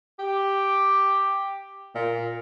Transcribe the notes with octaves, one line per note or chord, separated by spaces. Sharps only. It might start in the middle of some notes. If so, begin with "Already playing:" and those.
G4
A#2